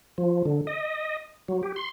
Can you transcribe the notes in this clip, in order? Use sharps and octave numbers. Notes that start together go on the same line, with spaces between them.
F3
D3
D#5
F#3
G4
C6